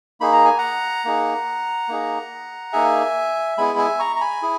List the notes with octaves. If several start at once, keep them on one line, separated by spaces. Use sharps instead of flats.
A#3 D#4 G#4 B5
A#5
G#5
F#5 A#5
A#3 D#4 G#4
A#3 D#4 G#4
A#3 D#4 G#4 E5 G#5
G#3 B3 E4 G#4 G#5 B5
E5 G#5
A#5 C#6
A#5
G#5 B5
E4 G#4